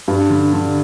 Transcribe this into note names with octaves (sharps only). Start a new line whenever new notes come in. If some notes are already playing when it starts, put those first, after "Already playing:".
G2
D3
D3